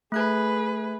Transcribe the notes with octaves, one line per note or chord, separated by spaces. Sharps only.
A3 G#4 B4 F#6 G#6